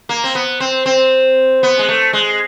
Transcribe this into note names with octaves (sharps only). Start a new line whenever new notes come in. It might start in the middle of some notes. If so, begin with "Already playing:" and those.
A#3
C4
B3
C4
C4
B3
G#3
A3
G#3